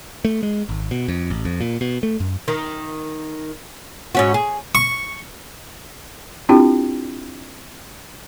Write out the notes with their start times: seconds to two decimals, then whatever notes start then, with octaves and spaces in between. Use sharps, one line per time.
0.25 A3
0.43 G#3
0.69 G#1
0.91 B2
1.08 F2
1.30 A1
1.45 F2
1.61 A#2
1.81 B2
2.03 A3
2.20 F#2
2.48 D#3
4.15 G#2 C#4 F#4
4.34 G#4
4.75 C#6
6.49 C4 D4 E4 F4 G4 G5